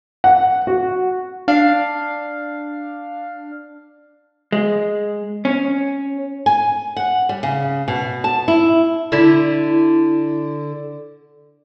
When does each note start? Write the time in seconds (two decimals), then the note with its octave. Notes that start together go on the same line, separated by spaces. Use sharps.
0.24 F#5
0.67 F#4
1.48 D4 F5
4.52 G#3
5.45 C#4
6.46 G#5
6.97 F#5
7.29 G3
7.43 C#3
7.88 B2
8.24 A5
8.48 E4
9.12 D3 E4